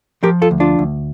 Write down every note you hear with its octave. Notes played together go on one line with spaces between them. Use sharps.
F3 G4 A#4
F4 A4
D2
D4 F4
D2